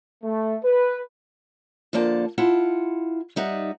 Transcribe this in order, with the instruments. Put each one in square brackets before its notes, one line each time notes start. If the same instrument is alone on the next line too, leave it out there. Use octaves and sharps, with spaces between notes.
[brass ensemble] A3
B4
[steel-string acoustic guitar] D3 F3 A#3 D5 A5
E4 F4 F#5 A5
G3 D#4 E5 F#5